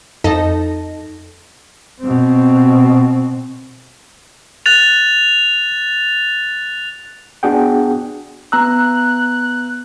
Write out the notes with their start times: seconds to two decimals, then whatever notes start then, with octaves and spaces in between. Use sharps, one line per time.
0.24 F2 D#4 A4 D#5 A5 A#6
2.01 B2 C4
4.66 F#6 A6 F7
7.43 B3 D4 F#4 G#4 F#5 G5
8.52 B3 A#5 E6 F#6